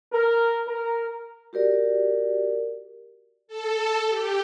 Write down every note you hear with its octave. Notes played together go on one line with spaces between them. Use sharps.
A#4
A#4
F#4 G4 A#4 D5
A4
G4